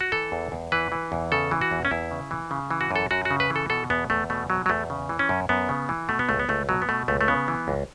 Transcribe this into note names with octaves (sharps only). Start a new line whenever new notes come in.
F#4
E3 A4
E2
E2
E3 B4
E3
E2
C#3 A4
E3
F#4
E2
C#4
E2 E4
C#3
E3
C#3
E3
F#4
F#2 A4
F#2 F#4
F#4
C#3
B4
E3
A4
B2 A4
E2 B3
E2 A3
B2 A3
B2 F#3
F#3
E2 A3
C#3
E3
C#4
F#2
F#2 B3
C#3
E3
B2 A3
B3
C#2 A3
B3
C#2 A3
B2 F#3
B3
B2 A3
C#2 A3
A3
C#3 B3
E3
C#2